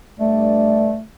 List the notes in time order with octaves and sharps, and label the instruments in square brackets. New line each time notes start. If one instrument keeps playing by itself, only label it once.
[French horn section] G2 D5 [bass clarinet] A3